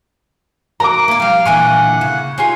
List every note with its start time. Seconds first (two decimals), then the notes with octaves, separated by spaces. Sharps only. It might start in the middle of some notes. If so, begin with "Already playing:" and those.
0.80 D2 F#4 A#4 A#5 D6
1.08 A#3 D5
1.20 F3 G3 F5
1.45 A#2 D3 E3 F#5 G#5 C#6
2.01 C#3
2.38 D#4 F4 G#4 C#5